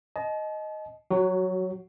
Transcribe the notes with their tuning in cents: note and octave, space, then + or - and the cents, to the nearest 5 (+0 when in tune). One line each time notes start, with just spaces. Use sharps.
D#5 +0 A5 -40
F#3 +0 F#4 +25